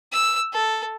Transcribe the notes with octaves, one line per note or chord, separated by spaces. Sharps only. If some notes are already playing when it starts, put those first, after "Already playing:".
E6
A4